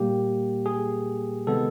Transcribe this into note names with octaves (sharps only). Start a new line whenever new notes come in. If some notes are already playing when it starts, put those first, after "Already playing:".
Already playing: A#2 G3 A#3 G4
G#4
C3 D#3 G#3 B3 A4